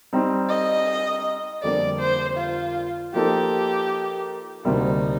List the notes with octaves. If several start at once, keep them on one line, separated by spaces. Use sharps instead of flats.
G3 C4 D#4
D#5
F2 D3 G3 A#3 D5
C5
F4
F3 A#3 D#4 G4 A4
D2 C3 G3 A#3 D#4